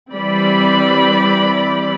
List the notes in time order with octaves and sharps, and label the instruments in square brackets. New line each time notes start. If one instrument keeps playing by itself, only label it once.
[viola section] E3 G3 C4 D5 B5